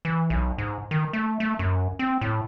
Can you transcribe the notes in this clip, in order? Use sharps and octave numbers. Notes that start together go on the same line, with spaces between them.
E3
B1
G#2
D#3
A3
A3
F#2
C4
A2